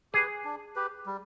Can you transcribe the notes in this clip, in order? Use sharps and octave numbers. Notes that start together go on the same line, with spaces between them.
G4 G#4 B4
D4
G4 B4
G3